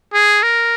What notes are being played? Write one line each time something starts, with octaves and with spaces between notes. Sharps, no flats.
G#4
A#4